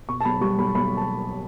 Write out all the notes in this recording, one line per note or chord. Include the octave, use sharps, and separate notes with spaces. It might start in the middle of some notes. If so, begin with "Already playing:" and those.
B2 C#6
A5
B1 B5
G3 C#6
B1 B5
B1 B5
A5